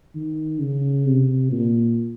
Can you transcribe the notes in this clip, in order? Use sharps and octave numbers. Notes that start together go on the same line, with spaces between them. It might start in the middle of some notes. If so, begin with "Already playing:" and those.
D#3
C#3
C3
A#2